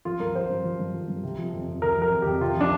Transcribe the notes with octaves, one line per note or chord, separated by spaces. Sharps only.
F3 F4
G2 A#4
F3 C5
G2
F3
G2
F3
G2
C3
F3
F2
F2
C3 A#4
F3 A#4
F2
F2 G4
C3 F4
F3 D4